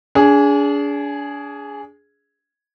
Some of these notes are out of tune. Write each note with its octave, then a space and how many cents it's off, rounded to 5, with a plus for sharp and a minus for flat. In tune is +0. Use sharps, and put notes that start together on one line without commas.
D4 -35 G#4 +0